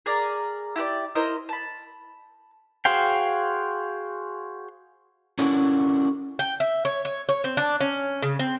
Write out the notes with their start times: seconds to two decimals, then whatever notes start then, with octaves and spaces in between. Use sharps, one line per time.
0.06 G#4 A#4 D5
0.76 E4 G4 C5 D5
1.15 E4 A#4 C5 D#5
1.49 A5 B5
2.85 F#4 G#4 C5 F5 G5
5.39 C#4 D4 E4 F#4 A4 A#4
6.39 G5
6.60 E5
6.85 C#5
7.05 C#5
7.29 C#5
7.44 C4
7.57 D4
7.81 C#4
8.23 C#3
8.39 C4